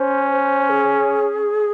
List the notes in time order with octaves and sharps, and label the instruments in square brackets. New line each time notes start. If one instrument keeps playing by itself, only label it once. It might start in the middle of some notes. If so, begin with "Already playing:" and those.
Already playing: [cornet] C#4 [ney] C5
[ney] C5
G#4